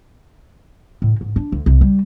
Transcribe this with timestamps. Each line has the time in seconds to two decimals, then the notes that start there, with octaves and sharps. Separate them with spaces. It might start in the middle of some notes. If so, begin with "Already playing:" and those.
1.02 A2
1.21 G#2
1.36 D4
1.52 D2
1.66 C2
1.81 G3